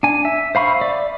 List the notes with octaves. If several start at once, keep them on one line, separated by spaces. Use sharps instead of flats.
D4 G#5
E5
C5 F5 B5 C#6
D5 E5